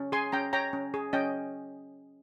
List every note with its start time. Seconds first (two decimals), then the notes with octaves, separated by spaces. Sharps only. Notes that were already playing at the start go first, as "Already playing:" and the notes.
Already playing: C#4
0.12 G#4 G#5 C6
0.32 C#4 G5 A#5
0.53 C#5 G5 A#5
0.73 C#4
0.94 G#4
1.13 C#4 D#5 G5